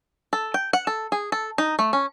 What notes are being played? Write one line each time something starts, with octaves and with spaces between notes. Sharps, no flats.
A4
G5
F#5
A4
G#4
A4
D#4
A3
C#4